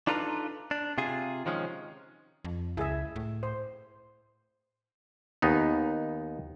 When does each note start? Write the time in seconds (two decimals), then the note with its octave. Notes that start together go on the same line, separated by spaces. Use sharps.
0.07 D4 D#4 F4 A4 B4 A#5
0.71 D4
0.98 C3 F4 G#4
1.46 D#3 F3 G#3 C#4
2.45 F2
2.77 C#2 E4 G#4 E5
3.16 A2
3.43 C5
5.42 D#2 B3 D#4